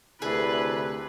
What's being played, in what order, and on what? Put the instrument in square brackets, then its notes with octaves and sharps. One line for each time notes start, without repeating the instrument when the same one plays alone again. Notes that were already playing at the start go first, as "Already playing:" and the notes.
[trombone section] D2 C3 [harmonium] E4 A4 D5 [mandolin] G#4 [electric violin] B4